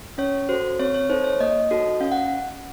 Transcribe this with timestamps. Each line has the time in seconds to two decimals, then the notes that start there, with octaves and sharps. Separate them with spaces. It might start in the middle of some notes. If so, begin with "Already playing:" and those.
0.18 C#4 C#5
0.49 F#4 A4 C5
0.79 C4 C#5
0.94 C#5
1.09 D#4 A4 C5
1.24 C#5
1.40 A#3 D#5
1.71 D#4 F#4 A4
2.00 C#4 F5
2.12 F#5